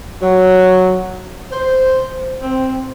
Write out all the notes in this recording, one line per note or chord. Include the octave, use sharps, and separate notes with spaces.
F#3
C5
C4